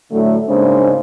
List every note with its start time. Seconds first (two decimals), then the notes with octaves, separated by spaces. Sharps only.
0.12 A2 D3 F#3 A3
0.49 G#2 C#3 G#3 A#3 D4 C5